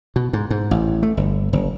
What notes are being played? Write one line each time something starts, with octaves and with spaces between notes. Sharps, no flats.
B2
G#2
G#2
A1
A3
G1
F#1